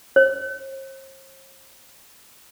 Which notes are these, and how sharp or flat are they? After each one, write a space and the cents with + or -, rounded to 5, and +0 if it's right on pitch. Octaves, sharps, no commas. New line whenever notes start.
C5 +45